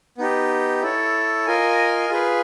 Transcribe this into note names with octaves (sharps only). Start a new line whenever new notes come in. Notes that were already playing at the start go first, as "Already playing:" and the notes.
B3 D#4 G4
E4 A4 C#5
F4 A#4 D#5 G#5
F4 G#4 B4